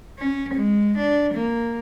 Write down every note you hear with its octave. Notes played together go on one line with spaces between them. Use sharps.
C#4
G#3
D4
A#3